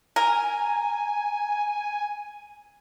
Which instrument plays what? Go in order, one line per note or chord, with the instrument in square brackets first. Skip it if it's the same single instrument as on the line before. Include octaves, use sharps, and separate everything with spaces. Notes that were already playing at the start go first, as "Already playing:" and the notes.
[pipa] A#4 [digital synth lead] G#5